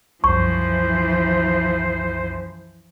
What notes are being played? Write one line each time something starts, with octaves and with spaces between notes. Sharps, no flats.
C2 F#2 E3 F3 C5 C#6